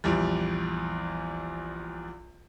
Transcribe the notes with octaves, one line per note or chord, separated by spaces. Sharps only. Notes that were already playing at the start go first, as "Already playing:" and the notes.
A#1 E2 G3